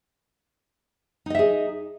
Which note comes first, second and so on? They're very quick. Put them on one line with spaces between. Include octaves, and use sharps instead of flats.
D#4 D#5 E5 G#4